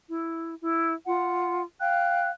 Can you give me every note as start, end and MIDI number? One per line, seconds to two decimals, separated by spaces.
0.08 0.54 64
0.61 0.93 64
1.05 1.61 65
1.05 1.61 78
1.80 2.29 77
1.80 2.29 79
1.80 2.29 90